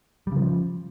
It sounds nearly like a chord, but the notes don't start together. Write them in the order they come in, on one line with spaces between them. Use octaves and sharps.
G3 C#3 F3